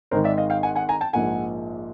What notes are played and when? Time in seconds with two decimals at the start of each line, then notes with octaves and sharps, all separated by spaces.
0.11 G#1 G#2 D#3 G#3 A#4 C5
0.24 D5 E5
0.37 D#5 F5
0.50 F5 G5
0.63 F#5 G#5
0.76 F#5 G#5
0.89 G#5 A#5
1.01 G5 A5
1.13 A#1 G#2 F3 A#3 F#5 G#5